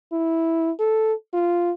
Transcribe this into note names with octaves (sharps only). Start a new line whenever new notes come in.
E4
A4
F4